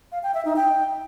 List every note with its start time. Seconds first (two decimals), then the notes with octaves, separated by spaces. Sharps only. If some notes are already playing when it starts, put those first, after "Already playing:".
0.12 F5
0.23 G5
0.34 E5
0.45 D#4
0.56 G5